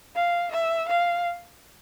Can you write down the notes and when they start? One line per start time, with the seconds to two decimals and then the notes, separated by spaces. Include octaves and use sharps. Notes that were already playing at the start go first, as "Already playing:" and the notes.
0.15 F5
0.51 E5
0.88 F5